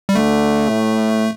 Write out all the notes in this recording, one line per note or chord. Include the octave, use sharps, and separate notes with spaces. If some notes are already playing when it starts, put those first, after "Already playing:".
G3
D3 A3
A2